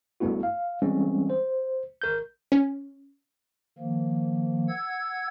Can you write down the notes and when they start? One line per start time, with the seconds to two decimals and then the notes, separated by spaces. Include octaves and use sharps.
0.20 A1 G2 A3 B3 E4 F#4
0.43 F5
0.82 E3 G3 G#3 C4 C#4
1.30 C5
2.02 G#1 A#4 G6
2.52 C#4
3.78 D#3 F3 A#3
4.68 F#5 E6 G#6